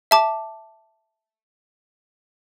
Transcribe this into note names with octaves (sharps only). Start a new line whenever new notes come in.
E5 A5 D6